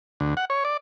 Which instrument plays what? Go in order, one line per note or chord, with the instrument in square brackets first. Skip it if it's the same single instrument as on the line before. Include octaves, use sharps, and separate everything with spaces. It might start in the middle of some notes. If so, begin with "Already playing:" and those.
[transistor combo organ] D2
F#5
C#5
D5